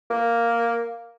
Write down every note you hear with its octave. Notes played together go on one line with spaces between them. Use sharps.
A#3